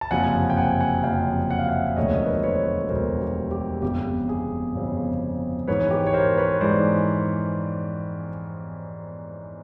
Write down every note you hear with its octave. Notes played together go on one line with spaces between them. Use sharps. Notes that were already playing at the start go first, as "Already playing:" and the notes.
A5
F#1 F2 C3 F3 F#5 G#5
G5
F#5 G#5
F#5 G#5
F#1 F2 C3 F3 F5 G5
F#5
F5
E5 F#5
E5
E1 D2 D3 F3 A3 C#5 D#5
A#4
B4
C5
B4 C#5
B4
E1 D2 D3 F3 A3 A#4 C5
G4
G4
G1 F2 C#3 G4
G#4
G1 F2 C#3
G#2 E3 G#3 B4 C#5
G4
C#5
A#4 C5
B4 C#5
G#2 E3 G#3 C5 D5